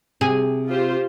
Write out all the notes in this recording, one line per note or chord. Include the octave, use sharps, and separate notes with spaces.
C3 G#4
F4 G4 C5